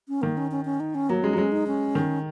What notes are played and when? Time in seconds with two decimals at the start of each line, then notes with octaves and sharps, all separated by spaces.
0.08 C#4
0.22 D#3 A#3
0.37 C#4
0.51 C#4
0.65 C#4
0.80 D#4
0.95 C#4
1.09 F#3 A#3
1.23 G#3 C#4
1.33 F#3
1.38 G#3 C#4
1.52 D#4
1.67 C#4
1.95 D#3